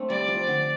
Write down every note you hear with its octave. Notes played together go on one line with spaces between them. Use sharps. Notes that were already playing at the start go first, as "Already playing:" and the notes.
Already playing: A3 C4 D4
G3 D5
F3
D3